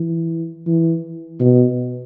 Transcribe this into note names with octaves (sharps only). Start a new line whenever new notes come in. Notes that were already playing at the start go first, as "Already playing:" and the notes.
Already playing: E3
E3
B2